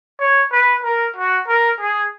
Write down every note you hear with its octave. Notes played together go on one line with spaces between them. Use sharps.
C#5
B4
A#4
F#4
A#4
G#4